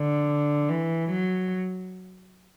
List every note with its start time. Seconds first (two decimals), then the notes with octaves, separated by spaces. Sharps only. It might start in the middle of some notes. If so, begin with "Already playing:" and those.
Already playing: D3
0.70 E3
1.10 F#3